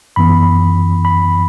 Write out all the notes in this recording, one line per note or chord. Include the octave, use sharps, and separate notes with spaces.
F#2 E3 B3 B5
B5